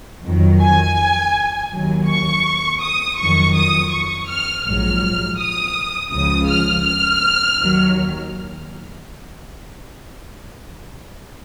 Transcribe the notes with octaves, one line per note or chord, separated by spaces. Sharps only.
F2 D#3 F#3
G#5
D#2 D#3 F#3
C#6
D#6
F2 D#3 F#3 C#6
D#6
C#6
F6
A#1 G#2 F#3 F6
D#6
C#2 C#3 F3 D#6
F6
F6
D#2 D#3 F#3